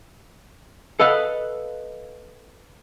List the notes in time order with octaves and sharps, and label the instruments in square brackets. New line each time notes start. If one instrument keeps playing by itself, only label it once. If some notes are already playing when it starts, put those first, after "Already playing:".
[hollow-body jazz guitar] A4 B4 D#5 F5 F#5